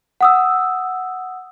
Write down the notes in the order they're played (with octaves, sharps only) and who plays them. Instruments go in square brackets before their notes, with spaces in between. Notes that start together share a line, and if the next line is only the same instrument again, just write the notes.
[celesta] F#5 D#6 E6